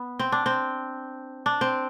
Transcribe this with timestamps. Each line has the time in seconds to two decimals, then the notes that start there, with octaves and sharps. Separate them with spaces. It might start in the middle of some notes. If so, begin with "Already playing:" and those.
Already playing: B3
0.19 C4
0.32 D4
0.46 C4
1.46 D4
1.61 C4